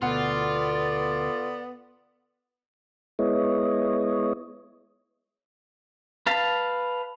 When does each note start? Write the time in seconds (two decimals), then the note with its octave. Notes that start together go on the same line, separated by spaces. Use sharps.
0.02 D2 B2 B3 F4 A4 D5 F#5
3.19 G#3 B3 E4 C#5 D#5
6.27 B4 F5 A5